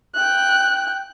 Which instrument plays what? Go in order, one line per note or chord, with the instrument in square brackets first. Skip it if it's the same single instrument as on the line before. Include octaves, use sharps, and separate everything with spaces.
[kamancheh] G5 F#6